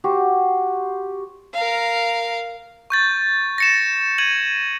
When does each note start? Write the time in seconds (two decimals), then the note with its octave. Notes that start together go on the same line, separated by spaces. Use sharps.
0.04 F#4 G4 C5
1.54 A#4 F5
2.90 C#6 G6 A6
3.58 A#6 C#7 E7
4.18 G#6 D#7 F#7